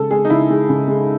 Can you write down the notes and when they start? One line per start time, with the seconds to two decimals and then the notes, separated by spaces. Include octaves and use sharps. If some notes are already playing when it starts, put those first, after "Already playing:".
Already playing: C#3 G#3 A4
0.11 G#3 G#4
0.25 D#4
0.30 C#3 E4
0.50 G#3
0.69 C#3
0.88 G#3